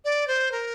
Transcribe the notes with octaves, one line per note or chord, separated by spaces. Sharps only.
D5
C5
A#4